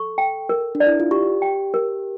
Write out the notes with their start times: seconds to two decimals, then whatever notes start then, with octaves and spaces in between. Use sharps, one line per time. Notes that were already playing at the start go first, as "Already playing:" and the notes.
Already playing: A4 C#6
0.18 G5
0.49 A#4
0.75 D4
0.80 D5
0.87 E4
1.00 F4
1.11 G4 C#6
1.42 G5
1.74 A#4